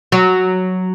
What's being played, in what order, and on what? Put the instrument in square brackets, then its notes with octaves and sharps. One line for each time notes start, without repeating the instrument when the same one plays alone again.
[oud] F#3